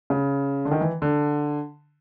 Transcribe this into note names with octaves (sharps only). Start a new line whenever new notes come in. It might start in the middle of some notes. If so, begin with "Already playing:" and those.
C#3
D3
D#3
E3
D3